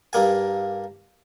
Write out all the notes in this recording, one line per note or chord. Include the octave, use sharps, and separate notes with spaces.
G2 A#3 G#5